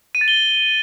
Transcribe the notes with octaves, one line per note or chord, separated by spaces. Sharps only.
D#7
A6
G7